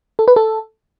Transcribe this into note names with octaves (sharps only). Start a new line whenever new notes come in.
A4
B4
A4